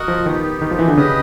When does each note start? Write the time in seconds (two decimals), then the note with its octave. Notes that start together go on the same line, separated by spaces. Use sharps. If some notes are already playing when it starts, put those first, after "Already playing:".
Already playing: F#4 A#4 D#5 F#5
0.08 F3
0.25 D#3 B3 D#4 G4
0.62 D#3
0.71 F3
0.79 E3
0.88 D3
0.97 C#3 G4 B4 D#5